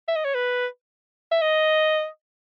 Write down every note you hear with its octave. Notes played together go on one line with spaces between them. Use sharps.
E5
D#5
C#5
B4
E5
D#5